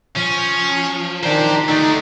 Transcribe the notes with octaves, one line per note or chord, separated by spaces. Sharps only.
F3 C#4
D#3 D4 G4 C5 A#5
A3 D4 D#4